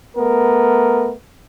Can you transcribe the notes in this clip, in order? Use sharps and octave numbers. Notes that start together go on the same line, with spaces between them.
A3 B3 A#4